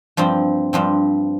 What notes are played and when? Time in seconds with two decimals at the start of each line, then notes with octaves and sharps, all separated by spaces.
0.17 G2 F3 C4
0.73 G2 F3 C4